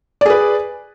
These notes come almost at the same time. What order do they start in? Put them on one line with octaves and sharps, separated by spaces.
D5 G#4 B4